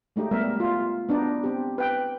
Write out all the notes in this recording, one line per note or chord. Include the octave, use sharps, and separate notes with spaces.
G#3 A3 D#4 G4
G3 A3 B3 A#4 E5
F4
B3 D4 D#4 D5
C4 G4
B4 G5